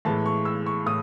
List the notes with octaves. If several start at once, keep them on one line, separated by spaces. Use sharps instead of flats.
A2 E3 G#3 A5
C#6
E6
C#6
A2 D#6